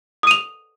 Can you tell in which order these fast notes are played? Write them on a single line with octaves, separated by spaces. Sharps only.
D#6 D#7 F7